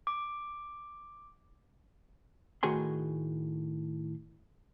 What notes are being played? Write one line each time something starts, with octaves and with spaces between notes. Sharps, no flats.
D6
A2 D#3 F#4 G#4 G#5 C6